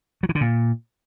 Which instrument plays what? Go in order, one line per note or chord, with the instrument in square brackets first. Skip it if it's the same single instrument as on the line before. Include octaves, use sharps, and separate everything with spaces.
[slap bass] F#3
E3
D3
A#2